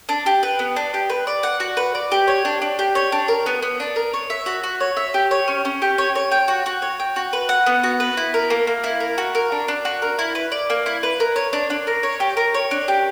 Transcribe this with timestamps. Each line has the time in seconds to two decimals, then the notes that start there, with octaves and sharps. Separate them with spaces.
0.09 D4
0.26 G4
0.43 B4
0.59 B3
0.76 D4
0.94 G4
1.10 B4
1.27 D5
1.43 F#5
1.60 F#4
1.77 B4
1.95 D5
2.12 G4
2.28 C#5
2.45 D4
2.62 D4
2.79 G4
2.95 C#5
3.12 D4
3.28 A#4
3.46 B3
3.62 B3
3.80 D4
3.96 A#4
4.14 C#5
4.30 E5
4.46 F#4
4.63 F#4
4.80 C#5
4.97 E5
5.14 G4
5.31 C#5
5.48 C#4
5.65 C#4
5.82 G4
5.98 C#5
6.15 C#5
6.31 G5
6.48 F#4
6.66 F#4
6.82 C#5
7.00 G5
7.16 F#4
7.33 B4
7.49 F#5
7.66 B3
7.84 F#4
8.00 B4
8.17 E4
8.34 A#4
8.50 A#3
8.67 A#3
8.84 E4
9.00 A#4
9.18 F#4
9.35 A#4
9.52 D4
9.68 D4
9.85 F#4
10.02 A#4
10.19 E4
10.35 B4
10.52 D5
10.70 A#3
10.86 E4
11.03 B4
11.20 A#4
11.36 C#5
11.53 D4
11.70 D4
11.87 A#4
12.03 C#5
12.20 G4
12.37 A#4
12.54 C#5
12.71 D4
12.88 G4